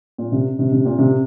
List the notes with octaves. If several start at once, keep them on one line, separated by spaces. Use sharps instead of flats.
A#2
C3
C3
C3
A#2
C3